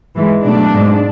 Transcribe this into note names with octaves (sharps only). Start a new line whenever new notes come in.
G#2 E3 G#3
B2 F#3 A3 D4
G#2 G#3